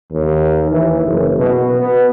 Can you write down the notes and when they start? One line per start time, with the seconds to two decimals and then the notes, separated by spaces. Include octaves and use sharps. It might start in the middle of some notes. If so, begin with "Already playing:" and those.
0.12 D#2
0.72 E3
1.06 F#1
1.38 B2
1.79 B3